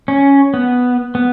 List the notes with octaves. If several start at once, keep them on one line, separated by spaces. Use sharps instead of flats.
C#4
B3
B3